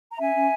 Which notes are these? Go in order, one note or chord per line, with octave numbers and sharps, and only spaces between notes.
A#5
C#4 E5 G#5
C#4